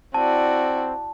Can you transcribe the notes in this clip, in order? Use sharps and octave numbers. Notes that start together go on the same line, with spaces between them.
C4 E4 F#4 D5 A5